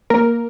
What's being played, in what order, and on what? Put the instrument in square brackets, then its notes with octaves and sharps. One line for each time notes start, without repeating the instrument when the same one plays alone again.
[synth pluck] A#3 A#4